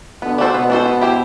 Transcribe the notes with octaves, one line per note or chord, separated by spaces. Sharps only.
B2 D3 B3
D4 F#4 A4 C5
B2 B3
D4 F#4 A4 C5
B3
E4 G4 C5